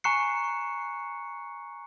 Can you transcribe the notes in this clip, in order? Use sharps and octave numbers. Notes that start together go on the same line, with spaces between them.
G#5 A#5 C#6 F#6 C7 C#7